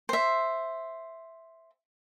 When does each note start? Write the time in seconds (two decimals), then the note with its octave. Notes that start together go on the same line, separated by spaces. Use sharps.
0.09 C5 E5